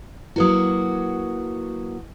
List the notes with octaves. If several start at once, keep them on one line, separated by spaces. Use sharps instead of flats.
F#3 A#3 E4 F#4 B4 D#6